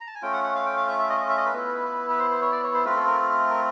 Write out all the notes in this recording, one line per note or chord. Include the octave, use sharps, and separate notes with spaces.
A#5
A5
G#5
A3 C#4 F4 G5
F#5
F#5
F5
G5
F5
E5
E5
D#5
E5
D#5
E5
D#5
B4
B3 E4
B4
C5
C5
C#5
D5
C#5
C5
A3 C4 F4 B4
A4
A#4
A#4